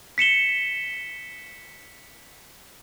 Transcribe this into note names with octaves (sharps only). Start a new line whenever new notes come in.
B6 C#7 E7 G7